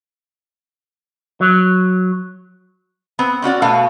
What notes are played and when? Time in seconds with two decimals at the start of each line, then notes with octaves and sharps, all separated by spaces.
1.41 F#3
3.19 B3 C4
3.42 C4 C#4 F#4 D5
3.62 B2 A3 F5